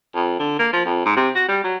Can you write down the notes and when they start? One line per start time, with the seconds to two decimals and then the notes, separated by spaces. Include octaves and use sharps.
0.15 F2
0.39 D3
0.59 A#3
0.73 F3
0.85 F2
1.05 G#2
1.17 C3
1.35 F#4
1.48 G3
1.64 F#3